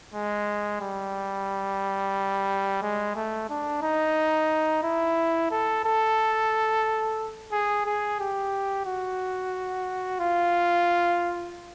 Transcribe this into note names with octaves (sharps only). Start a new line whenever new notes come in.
G#3
G3
G#3
A3
D4
D#4
E4
A4
A4
G#4
G#4
G4
F#4
F4